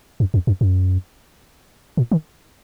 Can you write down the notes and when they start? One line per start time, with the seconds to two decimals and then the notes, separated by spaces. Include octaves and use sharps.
0.20 F#2
0.34 F2
0.47 F#2
0.61 F#2
1.97 A#2
2.11 D#3